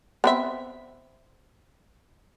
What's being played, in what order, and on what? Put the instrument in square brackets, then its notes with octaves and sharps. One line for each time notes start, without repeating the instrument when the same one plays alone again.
[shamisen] B3 C4 E5